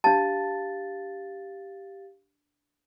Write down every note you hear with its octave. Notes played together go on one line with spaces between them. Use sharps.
D4 G4 F5 A5 A6